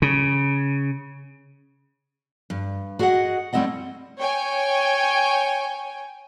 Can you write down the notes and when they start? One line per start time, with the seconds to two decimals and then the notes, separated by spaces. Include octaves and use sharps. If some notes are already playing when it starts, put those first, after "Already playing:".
0.02 C#3
2.50 G2
2.99 F#4 G#4 D#5 E5 F#5
3.53 G3 A3 C4 E4 D#5 F#5
4.19 C#5 G5 G#5